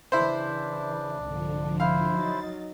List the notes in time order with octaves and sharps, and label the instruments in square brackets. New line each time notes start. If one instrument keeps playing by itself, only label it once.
[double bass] C#3 E3 [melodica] D4 [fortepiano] E4 C5
[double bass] C2 G#2 [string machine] D3 F3
[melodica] E4 C5 [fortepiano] F5
[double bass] F#3 D#4 [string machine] A6